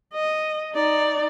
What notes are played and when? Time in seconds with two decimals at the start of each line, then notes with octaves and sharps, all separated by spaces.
0.14 D#5
0.74 D#4 D5